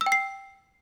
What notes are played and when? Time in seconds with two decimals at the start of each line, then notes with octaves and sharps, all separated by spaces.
0.01 E6
0.06 G5
0.12 C7